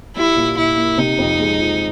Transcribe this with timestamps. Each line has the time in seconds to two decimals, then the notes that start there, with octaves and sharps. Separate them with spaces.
0.17 G3 E4
0.36 A#2
0.57 A#2 E4
0.77 A#3
0.98 C3 D#4
1.18 F2
1.39 G#3
1.59 F3